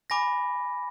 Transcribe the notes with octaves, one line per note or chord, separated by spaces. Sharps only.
G#5 B5 D6 A#6